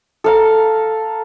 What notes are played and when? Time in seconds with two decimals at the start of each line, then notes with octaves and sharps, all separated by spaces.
0.24 A4 F5 A#5